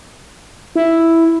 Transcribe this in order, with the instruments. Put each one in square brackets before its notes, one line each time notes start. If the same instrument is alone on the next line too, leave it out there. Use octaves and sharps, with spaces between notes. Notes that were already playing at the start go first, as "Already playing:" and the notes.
[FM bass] E4